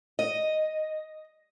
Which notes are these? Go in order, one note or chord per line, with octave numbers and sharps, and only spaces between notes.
D#5